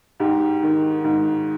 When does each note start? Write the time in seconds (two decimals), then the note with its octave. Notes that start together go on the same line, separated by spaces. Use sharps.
0.20 G#2 G4
0.63 D#3
1.04 G#2